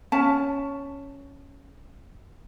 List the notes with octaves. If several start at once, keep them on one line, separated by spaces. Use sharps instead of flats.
C#4 A5